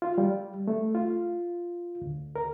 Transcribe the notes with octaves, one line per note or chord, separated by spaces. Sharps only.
F4
G3
A3
F4
D2
A#4